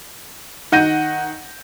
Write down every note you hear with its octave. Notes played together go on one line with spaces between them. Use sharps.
D#3 F#5 G6 A#6 D#7